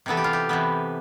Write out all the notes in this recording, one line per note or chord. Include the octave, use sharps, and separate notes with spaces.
C3 E3 B3 A4
G4
F4
G4
C3 E3 B3